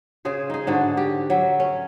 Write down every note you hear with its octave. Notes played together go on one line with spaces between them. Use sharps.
C#3 G#4 C5
D#4 G#4
G#2 D3 D4 F#4
G4
F#3 E5
C#4